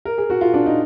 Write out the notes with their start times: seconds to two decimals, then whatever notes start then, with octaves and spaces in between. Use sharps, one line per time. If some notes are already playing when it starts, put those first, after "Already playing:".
0.05 A#4
0.18 G#4
0.30 F#4
0.41 F4
0.54 D4
0.66 D#4